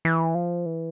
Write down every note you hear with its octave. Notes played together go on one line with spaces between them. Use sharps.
E3
F3
E3